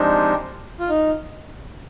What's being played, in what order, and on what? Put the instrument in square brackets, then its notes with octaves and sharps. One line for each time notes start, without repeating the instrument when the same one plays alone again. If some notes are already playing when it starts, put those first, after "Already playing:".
Already playing: [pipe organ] F3 G#3 C4 D#4 G4 [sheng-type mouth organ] D4
[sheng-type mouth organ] F4
D#4